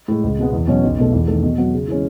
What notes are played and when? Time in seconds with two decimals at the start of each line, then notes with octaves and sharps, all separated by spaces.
0.08 A2 G#3
0.24 C#2
0.39 B2 G#3 B3
0.53 E2
0.67 B2 F#3 C#4
0.84 B1
0.99 B2 A3
1.12 E2
1.28 D#3 A3
1.43 B2
1.58 F#3 B3 F#4
1.73 C#3
1.88 E3 G#3 C#4